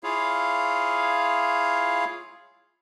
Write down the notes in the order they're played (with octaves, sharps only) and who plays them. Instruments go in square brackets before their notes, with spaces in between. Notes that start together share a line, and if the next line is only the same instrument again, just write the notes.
[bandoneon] E4 F4 G#4 C#5 F5